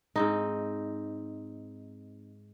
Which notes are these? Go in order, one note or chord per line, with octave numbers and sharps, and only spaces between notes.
G#2 C4 D#4